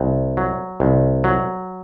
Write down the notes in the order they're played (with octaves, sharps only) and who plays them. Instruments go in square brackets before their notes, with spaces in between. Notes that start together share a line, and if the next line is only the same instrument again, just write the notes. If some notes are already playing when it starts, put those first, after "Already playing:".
Already playing: [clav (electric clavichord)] C2
F#3
C2
F#3